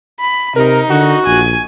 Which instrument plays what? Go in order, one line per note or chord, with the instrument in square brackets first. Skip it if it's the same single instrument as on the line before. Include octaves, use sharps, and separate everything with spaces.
[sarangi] B5
[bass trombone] C3 [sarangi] D#4 [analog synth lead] A#4
[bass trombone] D3 [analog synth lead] F#4
[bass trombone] A#1 [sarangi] G#5